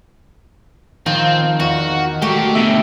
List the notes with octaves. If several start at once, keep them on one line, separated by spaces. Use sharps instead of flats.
D#3 F3 C4
E2 F#4
C3 A3 F#4 G4
B2 D3 E5